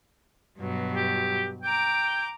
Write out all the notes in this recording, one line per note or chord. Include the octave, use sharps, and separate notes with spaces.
G2 B2 F#3
G4
G5 A#5 D6